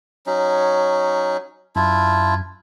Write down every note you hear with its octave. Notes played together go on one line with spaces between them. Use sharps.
F#3 C#4 D#4
F#2 D4 E4 F4